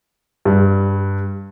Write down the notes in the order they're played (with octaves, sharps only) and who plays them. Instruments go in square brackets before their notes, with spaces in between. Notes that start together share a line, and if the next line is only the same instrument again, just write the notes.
[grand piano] G2 G3